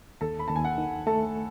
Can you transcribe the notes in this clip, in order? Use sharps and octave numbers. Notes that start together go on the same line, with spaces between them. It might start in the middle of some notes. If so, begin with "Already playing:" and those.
D#2 A4 A5
B5
D#2 A5
G#5
F#5
D#3
A3 A4 A5